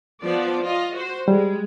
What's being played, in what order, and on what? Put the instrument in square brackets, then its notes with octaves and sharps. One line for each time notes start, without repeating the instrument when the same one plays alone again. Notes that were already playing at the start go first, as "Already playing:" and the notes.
[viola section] F3 B3 D5
F4 D#5
F#4 C5
[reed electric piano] G3 [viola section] G#3